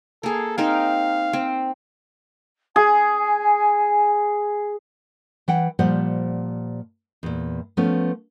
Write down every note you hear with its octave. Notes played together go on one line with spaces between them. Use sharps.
A#3 G#4 A4
C4 D#4 A#4 F5
C4
G#4 G#5
E3 F#5 G5
A#2 F3 G3 C5 F#5
E2 A#2
F3 A3 B3 C#4